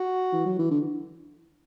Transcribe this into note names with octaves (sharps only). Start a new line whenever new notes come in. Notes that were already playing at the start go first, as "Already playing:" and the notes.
Already playing: F#4
E3
F#3
E3
D3